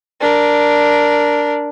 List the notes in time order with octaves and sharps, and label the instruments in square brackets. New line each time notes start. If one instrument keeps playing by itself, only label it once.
[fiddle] D4 A#4